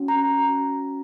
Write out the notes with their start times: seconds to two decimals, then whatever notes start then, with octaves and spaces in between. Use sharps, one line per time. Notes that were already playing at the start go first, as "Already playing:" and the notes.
Already playing: C#4 F#4
0.08 A#5